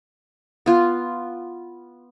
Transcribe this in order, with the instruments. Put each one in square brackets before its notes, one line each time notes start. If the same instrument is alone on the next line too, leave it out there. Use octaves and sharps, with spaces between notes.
[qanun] B3 F4